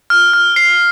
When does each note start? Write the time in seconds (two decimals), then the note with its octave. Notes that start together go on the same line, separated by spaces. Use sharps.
0.10 F6
0.33 F6
0.56 C7